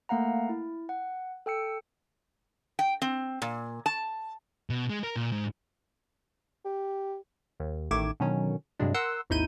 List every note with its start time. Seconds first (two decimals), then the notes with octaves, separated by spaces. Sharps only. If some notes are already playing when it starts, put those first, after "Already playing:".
0.09 A3 A#3 F5 F#5 A#5
0.49 E4
0.89 F#5
1.46 A4 G5 E6 C#7
2.79 G5
3.02 C4
3.42 A#2
3.86 A5
4.70 B2
4.90 G#3
5.04 A#4
5.16 A#2
5.32 G#2
6.65 G4
7.60 D#2
7.91 A1 D#3 A3 D6 G#6 E7
8.20 B2 D3 D#3 F#3 C#4
8.80 G2 C3 F#3 G#3 D4
8.94 A#4 F#5 C6 E6
9.30 G#1 D#2 D#4 E4 G6 D#7